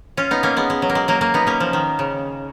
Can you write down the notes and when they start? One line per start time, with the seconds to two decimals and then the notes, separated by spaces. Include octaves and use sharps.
0.17 C#4 F4
0.31 B3 D#4
0.43 A#3 C#4
0.57 G#3 B3
0.70 G#3
0.82 F#3
0.90 A#3
0.95 G#3
1.08 F#3 A#3
1.21 F#3 A#3
1.34 B3 D#4
1.47 A#3 C#4
1.60 F3
1.73 D#3
1.99 C#3